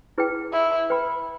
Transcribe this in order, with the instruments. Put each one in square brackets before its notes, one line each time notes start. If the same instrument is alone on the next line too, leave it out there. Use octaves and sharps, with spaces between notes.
[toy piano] E4 G#4 B4 G5
[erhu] E4
[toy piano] B4 G5 B5